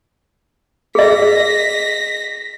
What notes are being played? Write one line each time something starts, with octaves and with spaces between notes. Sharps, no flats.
G#4 D#5 A#6 B6